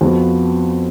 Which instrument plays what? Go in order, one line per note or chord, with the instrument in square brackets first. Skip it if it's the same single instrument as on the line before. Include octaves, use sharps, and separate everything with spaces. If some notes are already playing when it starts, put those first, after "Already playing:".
[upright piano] F2 F3 B3 F#4